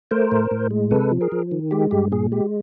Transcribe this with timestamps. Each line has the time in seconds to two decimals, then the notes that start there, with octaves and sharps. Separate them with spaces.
0.11 A3 A#4 C5
0.32 A2
0.51 A2
0.71 G#3
0.91 C3 A4 B4
1.11 F3
1.21 G#4 A#4
1.32 F3
1.52 D#3
1.71 G#3 G4
1.91 G2 G4
2.12 A#2 G#4
2.32 G#3 G4